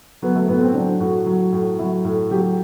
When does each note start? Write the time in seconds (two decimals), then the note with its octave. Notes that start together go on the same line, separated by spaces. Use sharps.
0.22 F#3 B3
0.36 A3
0.48 A2 B3
0.62 C4
0.74 F#3 D4
1.00 A2 F#4
1.26 F#3
1.52 A2
1.79 F#3 E4
2.05 A2
2.31 F#3 G4